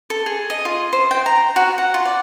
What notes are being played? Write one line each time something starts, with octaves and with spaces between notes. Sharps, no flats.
A4
G#4
D#5
F4
C5
G5
A#5
F#4
F#5
F4
D5